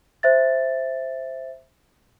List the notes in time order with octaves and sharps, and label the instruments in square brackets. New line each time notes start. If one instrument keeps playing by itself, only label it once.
[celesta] C5 E5 A6